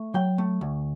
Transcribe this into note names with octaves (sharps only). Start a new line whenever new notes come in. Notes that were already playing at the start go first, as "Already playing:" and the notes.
Already playing: A3
F#3 G5
A3
D2